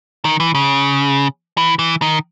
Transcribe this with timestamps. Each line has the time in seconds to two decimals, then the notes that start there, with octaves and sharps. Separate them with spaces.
0.25 D#3
0.40 E3
0.55 C#3
1.57 E3
1.79 E3
2.02 D#3